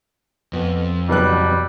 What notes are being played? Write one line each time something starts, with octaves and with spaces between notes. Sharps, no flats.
F2 B3
F#1 B2 G3 B3 F#6